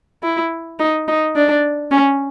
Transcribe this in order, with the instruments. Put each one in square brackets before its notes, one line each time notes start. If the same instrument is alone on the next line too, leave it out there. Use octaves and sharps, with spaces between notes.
[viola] E4
D#4
D#4
D4
C#4